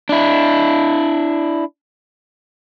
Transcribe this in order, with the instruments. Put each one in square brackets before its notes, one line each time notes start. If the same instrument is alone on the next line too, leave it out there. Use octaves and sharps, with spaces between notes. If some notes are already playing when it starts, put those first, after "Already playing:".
[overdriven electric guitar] D4 E4